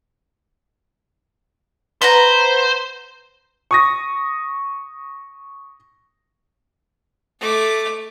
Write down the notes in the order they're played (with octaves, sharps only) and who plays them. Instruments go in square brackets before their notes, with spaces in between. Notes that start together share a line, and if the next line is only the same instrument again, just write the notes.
[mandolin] B4 F#5 A#5 [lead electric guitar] C5
[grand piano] C#6 D#6 A#6
[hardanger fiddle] A3 D6